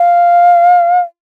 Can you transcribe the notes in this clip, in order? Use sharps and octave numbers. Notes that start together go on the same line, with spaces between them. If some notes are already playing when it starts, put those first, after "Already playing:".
Already playing: F5